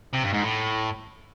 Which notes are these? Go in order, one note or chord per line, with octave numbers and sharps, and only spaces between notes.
C3
G2
G#2
A2